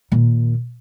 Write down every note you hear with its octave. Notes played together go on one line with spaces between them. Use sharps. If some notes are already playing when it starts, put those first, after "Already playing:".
A#2 D#3